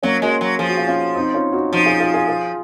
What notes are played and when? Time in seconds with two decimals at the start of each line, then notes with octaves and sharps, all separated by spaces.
0.03 F#3 A#3 C#4
0.22 G#3 F#4 A#4
0.41 F#3
0.59 F3 G#4
0.69 F#4
0.77 F4 G#4
0.88 C#4 F4
1.16 C4 D#4
1.34 C#4 F4
1.53 D#4 F#4
1.72 F3 D#4 F#4
1.85 F4 G#4
2.00 F4 G#4
2.14 F4 G#4
2.28 F4 G#4